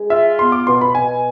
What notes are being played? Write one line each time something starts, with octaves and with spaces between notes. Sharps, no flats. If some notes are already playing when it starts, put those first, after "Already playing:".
Already playing: G#3
F4 E5
B3 C6
D6
B2 C6
B5
B2 G#5